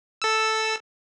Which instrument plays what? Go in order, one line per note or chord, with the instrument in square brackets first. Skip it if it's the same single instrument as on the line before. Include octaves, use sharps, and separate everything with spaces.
[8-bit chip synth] A4 E6